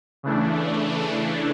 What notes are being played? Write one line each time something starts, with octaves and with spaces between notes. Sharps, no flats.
C#3 E3 A3 D4